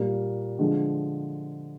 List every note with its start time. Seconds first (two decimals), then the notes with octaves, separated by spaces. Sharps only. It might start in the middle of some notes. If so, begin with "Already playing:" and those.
Already playing: A#2 G3 A#3
0.59 D3 F3 G#3